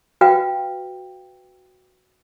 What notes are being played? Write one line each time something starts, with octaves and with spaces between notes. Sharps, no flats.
F#4 B4 F5 G5